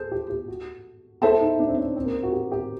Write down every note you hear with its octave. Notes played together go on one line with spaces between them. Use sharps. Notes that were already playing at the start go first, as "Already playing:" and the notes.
Already playing: G#4 A4 C5
G4
G4
F#4
E4 A4 C5 E5 A5
D#4
D4
C4
C#4
C4
A#3
F#4
G4
G4